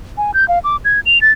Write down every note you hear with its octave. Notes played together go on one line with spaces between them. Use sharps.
G#5
G6
F5
D6
G#6
F7
A6